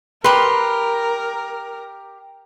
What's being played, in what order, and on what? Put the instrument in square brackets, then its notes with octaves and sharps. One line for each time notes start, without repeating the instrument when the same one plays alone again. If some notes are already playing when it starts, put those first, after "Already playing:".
[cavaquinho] G4 C6 [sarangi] A#4 [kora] B4